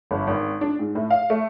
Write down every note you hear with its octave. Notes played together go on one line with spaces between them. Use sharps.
G1
G#1
D4
G#2
A2
F5
A3